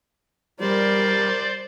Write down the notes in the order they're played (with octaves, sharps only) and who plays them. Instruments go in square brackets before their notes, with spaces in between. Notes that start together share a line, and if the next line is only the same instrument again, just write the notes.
[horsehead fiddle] G3 A#4 [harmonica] C5 D5